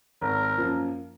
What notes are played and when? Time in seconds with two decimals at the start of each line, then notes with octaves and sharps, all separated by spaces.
0.22 G#1 A#4
0.58 F#2 F3 A#3